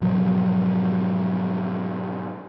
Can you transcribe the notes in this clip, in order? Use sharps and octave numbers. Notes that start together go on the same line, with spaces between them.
G#2 B2 F3 F#3